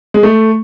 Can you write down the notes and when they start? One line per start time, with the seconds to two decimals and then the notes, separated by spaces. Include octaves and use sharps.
0.14 G#3
0.23 A3